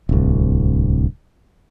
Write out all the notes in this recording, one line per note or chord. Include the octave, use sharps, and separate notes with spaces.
D1 C2